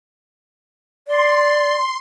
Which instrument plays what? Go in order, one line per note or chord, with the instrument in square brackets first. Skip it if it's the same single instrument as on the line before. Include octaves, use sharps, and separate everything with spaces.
[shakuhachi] D5 [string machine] C6